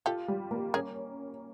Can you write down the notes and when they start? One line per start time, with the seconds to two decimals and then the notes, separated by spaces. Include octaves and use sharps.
0.06 F4 G4 A4
0.28 G3
0.51 A#3
0.74 C#4 G#4 A#4